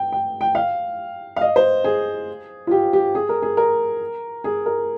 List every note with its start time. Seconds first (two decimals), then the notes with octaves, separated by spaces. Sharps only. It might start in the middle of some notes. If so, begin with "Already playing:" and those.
Already playing: G5
0.12 G5
0.41 G5
0.55 F5
1.36 F5
1.41 D#5
1.56 C5
1.84 G#4
2.67 F4
2.71 G4
2.93 G4
3.15 G#4
3.29 A#4
3.42 G#4
3.57 A#4
4.44 G#4
4.66 A#4